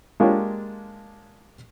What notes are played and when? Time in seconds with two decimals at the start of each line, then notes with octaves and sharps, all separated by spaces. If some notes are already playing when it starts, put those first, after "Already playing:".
0.20 G#3 A#3 D4 F4 G4 C#5